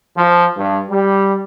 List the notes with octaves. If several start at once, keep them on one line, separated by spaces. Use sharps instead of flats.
F3
G2
G3